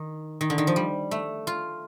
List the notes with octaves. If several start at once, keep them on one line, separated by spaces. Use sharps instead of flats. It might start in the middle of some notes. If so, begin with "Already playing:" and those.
Already playing: D#3
D#3
D3
D#3
F3
G3
A3
F4